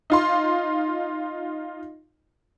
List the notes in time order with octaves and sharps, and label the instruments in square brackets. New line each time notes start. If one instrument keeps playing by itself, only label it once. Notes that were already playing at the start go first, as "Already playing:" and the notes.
[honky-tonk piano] D#4 F4 C6